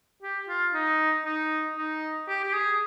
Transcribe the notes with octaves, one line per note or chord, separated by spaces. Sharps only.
G4
F4
D#4
D#4
D#4
G4
G4
G#4